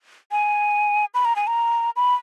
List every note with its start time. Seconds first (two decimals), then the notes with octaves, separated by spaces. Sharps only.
0.31 G#5
1.14 B5
1.25 A#5
1.36 G#5
1.47 A#5
1.96 B5